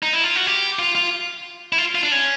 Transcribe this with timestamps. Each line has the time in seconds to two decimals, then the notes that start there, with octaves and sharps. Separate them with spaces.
0.03 D#4
0.13 E4
0.24 F4
0.36 F#4
0.47 G4
0.79 F4
0.95 F4
1.73 E4
1.78 F4
1.95 F4
2.03 D4
2.12 C#4